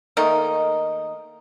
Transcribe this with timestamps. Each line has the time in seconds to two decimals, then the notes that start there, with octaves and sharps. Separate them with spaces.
0.17 D#3 A3 A#3 D#4